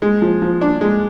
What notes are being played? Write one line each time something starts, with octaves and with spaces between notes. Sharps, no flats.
G#3
F3
F3
D4
G#3